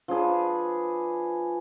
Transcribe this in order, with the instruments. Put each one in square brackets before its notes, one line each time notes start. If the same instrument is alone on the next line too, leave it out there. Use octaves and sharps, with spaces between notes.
[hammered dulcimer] F3 D4 G#4 B4